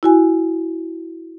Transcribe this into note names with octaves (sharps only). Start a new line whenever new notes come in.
E4 F#4 G#5